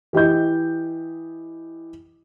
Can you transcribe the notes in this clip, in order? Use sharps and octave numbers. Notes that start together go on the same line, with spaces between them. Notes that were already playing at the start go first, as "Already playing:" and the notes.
E3 G4 D#5 G6